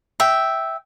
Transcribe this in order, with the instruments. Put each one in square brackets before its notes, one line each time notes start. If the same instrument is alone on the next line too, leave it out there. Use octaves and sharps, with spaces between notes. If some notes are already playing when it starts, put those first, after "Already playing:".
[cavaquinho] E5 G5